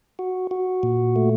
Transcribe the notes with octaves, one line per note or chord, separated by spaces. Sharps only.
F#4
F#4
A#2
A3